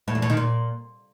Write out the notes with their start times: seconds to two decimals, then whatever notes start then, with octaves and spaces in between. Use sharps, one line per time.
0.08 A2
0.15 E2
0.22 A2
0.30 D#3
0.37 A#2